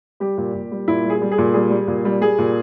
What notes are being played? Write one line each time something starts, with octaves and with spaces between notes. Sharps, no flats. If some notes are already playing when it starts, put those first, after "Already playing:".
G3 G4
A#2
A#2
G3
A#2 E4
G3
G#4
G3
G#4
A#2
G3 G#4
G3
A#2
G3
G3 G#4
A#2